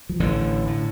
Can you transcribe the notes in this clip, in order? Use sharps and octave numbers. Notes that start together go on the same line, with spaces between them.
F3
A1 A2 D3
A2